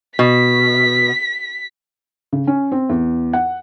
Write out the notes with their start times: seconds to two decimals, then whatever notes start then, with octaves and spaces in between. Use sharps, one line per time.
0.19 B2 B6
2.33 C#3
2.47 C#4
2.72 C4
2.89 E2
3.33 F#5